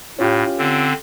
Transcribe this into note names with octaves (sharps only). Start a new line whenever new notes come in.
A2 C#4 F4 G4
D3 C4